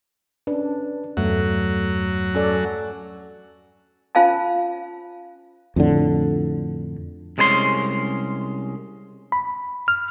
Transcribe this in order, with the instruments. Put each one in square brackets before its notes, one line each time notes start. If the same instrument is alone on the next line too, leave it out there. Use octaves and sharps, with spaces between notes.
[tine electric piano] C#4 B4 [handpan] D4
[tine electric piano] E2 G2 [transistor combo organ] F#3 [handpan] A3
[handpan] C#4 A4 D5
[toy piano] C#4 F4 C5 F5 G#5 A5
[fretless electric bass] F2 A2 D3
[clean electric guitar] C2 G#3 C#4 G#5 C6
[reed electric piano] B5
F6